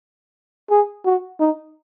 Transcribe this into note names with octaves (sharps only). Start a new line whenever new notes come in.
G#4
F#4
D#4